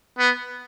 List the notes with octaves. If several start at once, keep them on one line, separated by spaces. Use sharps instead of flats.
B3